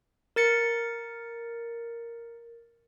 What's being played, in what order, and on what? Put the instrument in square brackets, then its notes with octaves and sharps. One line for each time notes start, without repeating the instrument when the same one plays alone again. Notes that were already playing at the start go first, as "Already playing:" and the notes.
[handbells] A#4 A6 C#7